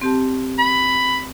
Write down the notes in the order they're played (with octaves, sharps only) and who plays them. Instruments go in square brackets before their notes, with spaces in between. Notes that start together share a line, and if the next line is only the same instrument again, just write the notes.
[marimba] C4 G4 A5
[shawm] B5